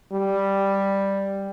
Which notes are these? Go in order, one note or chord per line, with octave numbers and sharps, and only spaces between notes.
G3